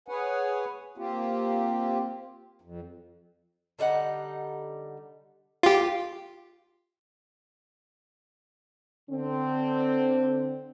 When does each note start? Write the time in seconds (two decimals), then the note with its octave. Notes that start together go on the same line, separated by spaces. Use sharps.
0.08 G#4 B4 C#5 F#5 G#5
0.98 A#3 C4 F4 G4
2.62 F2
3.79 D3 G3 D#4 F#5
5.63 F4 G4
9.10 D3 C4